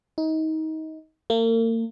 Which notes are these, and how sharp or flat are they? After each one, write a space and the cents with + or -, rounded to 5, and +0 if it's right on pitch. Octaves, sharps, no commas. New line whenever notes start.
D#4 +25
A#3 -40